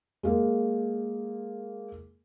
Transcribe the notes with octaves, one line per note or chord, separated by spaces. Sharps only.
G#3 A#3